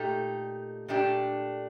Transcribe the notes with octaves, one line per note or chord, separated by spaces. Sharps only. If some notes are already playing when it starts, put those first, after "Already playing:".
Already playing: A#2 A3 D#4 G4
A#2 A3 D4 G4